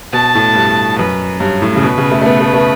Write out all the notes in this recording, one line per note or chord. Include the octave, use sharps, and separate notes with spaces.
B2 A5
A2
G2
F#2 B4
G2 C#5
A2
C#3
B2 B4
C#3
A3
A3
B3 B4
A3
A3